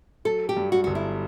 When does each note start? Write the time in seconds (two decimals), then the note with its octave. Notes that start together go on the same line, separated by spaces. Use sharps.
0.25 F#3 A4
0.49 G4
0.57 G2
0.72 F#4
0.84 G1 F#4
0.95 E4